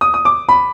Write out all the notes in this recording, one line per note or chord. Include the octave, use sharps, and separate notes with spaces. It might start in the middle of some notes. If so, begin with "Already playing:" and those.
D#6
D#6
D6
B5